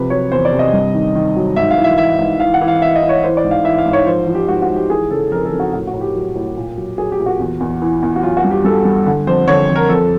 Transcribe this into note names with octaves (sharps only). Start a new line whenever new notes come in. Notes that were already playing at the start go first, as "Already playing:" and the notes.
Already playing: C3 F3 B4
F#3 C#5
E2 C5
D5
C3
D#5
G2
D#3
D#3
F#3
G#2 E5
F5
E3
E5
E3 E5
G#2
E3 F5
F#5
E3
F5
E3 E5
D#5
E3
C#5
E3 C5
D5
G#2
F5
E3 E5
F5
G#2
C#5
F3 C5
F3
G4
G#2 F#4
F#4
G#2
G4
E3 G#4
C#3 A4
F2 A#4
A4
F2
F#4
A2 F#4
F#4
A2
G4
F#3
A2
A#2
F#3
F#3 G#4
G4
A#2
F#4
E2
E2
E3
E2
F#4
F#3 F4
F#4
G2
G4
G2 A4
G2
D3
F2 C5
D3 C#5
F2
A#4
F2 A4